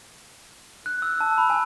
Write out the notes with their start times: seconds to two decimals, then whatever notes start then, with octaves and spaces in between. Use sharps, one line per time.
0.86 F#6
1.02 E6
1.21 A5
1.38 B5
1.50 G#5